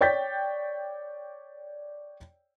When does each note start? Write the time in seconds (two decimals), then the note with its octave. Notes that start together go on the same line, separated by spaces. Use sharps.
0.01 C#5 D5 G5 G6 A6 B6